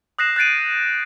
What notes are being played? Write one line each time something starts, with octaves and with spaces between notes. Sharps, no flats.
D#6 F#6 A#6 C7 E7
F#6 G6 A6 C7 D7 D#7